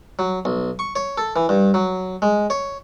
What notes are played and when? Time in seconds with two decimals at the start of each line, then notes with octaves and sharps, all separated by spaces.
0.19 F#3
0.45 B1
0.79 C#6
0.96 C#5
1.18 A4
1.36 E3
1.49 G2
1.74 F#3
2.22 G#3
2.50 C#5